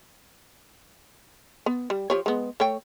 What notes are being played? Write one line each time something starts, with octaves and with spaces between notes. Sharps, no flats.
B3
G3
F3 G4 C#5
G#3 B3
A3 C#5 G5